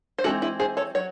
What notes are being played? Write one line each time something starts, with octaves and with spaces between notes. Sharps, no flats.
C5
E3 G#3 C4 D#4 F#4 A4
E4 G#4
G#4 C5
A4 C#5
F#3 C#5